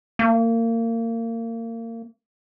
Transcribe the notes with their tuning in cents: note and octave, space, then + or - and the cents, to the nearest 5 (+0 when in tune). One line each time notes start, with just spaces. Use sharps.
A#3 -30